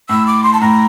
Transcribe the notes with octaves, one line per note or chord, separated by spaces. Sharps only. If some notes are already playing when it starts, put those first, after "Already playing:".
A2 E6
D6
C6
A5
A2 A#5